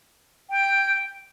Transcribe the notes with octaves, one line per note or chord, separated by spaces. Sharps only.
G5